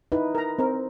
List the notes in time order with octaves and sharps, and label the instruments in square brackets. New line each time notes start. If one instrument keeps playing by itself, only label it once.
[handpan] D#4 E4 B4
[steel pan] A#4 A#5
C4 A#4